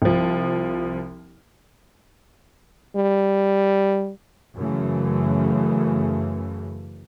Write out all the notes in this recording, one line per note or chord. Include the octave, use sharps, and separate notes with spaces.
C2 F3
G3
F#2 C#3 E3 A3